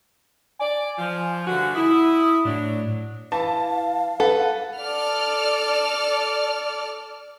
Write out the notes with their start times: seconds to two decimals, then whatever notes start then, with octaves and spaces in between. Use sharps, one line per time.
0.59 D5 G#5
0.98 F3
1.47 G2 D3 F#4
1.75 E4 D#6
2.45 A2 F#3 D4
3.32 E3 F5 A5
4.20 A4 B4 F#5
4.80 A4 D5 F6